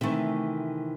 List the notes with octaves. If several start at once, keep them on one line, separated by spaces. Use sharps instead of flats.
C3 D#3 E3 A3 E5